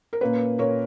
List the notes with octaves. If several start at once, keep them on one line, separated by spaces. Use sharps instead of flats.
A#4
A#2 A#3 C#4 B4
A#2 A#3 C#4 A#4 C#5